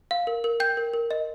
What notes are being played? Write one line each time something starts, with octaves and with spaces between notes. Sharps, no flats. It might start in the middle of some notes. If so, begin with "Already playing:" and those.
F5
A#4
A#4
G5 G6
A#4
A#4
D#5